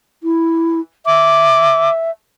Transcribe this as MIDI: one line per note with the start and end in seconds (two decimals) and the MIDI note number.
0.23 0.80 64
1.06 2.11 76
1.06 1.89 86